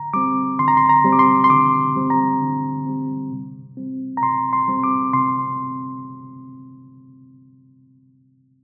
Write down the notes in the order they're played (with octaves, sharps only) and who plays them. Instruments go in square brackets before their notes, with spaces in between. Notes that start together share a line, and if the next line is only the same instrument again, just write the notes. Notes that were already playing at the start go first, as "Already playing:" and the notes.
Already playing: [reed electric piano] D3 A#5
G3 C4 D6
D3 C6
A#5
C6
A#5
G3 C4
D6
C6
C6
D3 D6
G3 C4
A#5
D3
G3 C4
C3
G3 C4
A#5
C3 C6
C6
G3 C4
D6
C3 C6